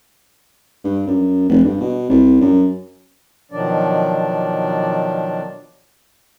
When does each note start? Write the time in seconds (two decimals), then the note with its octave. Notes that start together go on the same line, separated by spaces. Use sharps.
0.84 G2
1.07 F#2
1.49 F1
1.64 G2
1.81 B2
2.09 C2
2.41 F#2
3.52 B2 D#3 F3 F#3 D4 D5